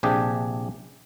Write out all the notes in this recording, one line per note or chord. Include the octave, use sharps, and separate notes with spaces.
A#1 C3 D4 G4 G#4